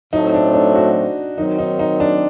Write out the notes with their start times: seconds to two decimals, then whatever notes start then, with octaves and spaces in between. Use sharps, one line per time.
0.13 A2 F#3 A3 C4 D#4
0.34 D4
0.54 D4
0.75 F#4
1.38 D#3 F#3 C4 D#4
1.58 D#4
1.79 D#4
2.00 D4